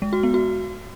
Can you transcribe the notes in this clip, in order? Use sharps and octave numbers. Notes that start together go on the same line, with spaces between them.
G#3
F#4
B3
F#4